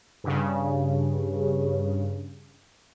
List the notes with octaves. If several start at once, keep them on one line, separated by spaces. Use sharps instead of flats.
G2 C#3